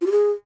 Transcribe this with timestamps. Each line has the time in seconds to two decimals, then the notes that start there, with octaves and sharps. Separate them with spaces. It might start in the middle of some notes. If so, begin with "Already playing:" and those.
0.01 F4
0.06 G4
0.12 G#4